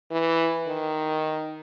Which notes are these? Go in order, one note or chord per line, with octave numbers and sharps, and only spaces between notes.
E3
D#3